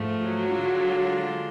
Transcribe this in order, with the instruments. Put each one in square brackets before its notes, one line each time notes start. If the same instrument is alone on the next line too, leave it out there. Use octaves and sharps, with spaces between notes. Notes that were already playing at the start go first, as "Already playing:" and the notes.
Already playing: [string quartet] G#2 F3 A3
[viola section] F#3
[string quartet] D3 G#3 D4 F4